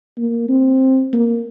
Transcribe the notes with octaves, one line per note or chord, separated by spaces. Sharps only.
A#3
C4
A#3